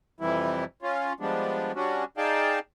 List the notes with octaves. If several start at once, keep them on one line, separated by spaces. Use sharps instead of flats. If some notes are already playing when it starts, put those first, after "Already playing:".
F2 C3 E3 G3 E4
C#4 F4
F3 G3 G#3 B3 D4
G3 C#4 D4 F#4
D#4 G#4 D5 F5 G5 A5